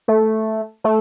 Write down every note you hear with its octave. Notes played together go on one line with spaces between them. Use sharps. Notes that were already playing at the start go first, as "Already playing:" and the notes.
A3
A3